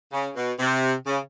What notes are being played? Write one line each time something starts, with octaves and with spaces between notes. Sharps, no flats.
C#3
B2
C3
C#3